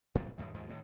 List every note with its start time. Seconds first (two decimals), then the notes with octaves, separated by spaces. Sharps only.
0.15 A2 C3 F#3 G3
0.38 F#2 A2 D#3
0.54 D#2 G#2 F3
0.69 A2 C3 D#3